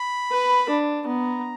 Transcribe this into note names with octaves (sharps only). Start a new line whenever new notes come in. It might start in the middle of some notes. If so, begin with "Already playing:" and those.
Already playing: B5
B4
D4
B3 A#5